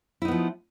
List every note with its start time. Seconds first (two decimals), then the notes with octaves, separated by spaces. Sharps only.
0.22 E4
0.25 D#4
0.28 B3
0.32 F3